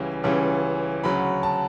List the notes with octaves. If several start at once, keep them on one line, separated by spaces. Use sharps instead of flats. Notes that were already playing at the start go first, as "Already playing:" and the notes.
Already playing: C#2 C#3 E3 G3 C#4
C#2 C#3 E3 G3 C#4
D2 C#3 F#3 B5
A5